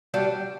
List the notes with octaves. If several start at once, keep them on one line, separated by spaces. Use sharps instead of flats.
G3 D4 F#4